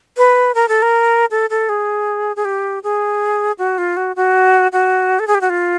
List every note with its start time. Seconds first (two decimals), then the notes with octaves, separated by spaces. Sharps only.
0.17 B4
0.55 A#4
0.68 A4
0.82 A#4
1.31 A4
1.50 A4
1.69 G#4
2.36 G#4
2.45 G4
2.83 G#4
3.58 F#4
3.78 F4
3.97 F#4
4.16 F#4
4.72 F#4
5.19 A4
5.27 G#4
5.35 G4
5.41 F#4
5.50 F4